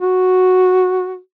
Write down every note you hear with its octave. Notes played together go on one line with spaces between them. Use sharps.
F#4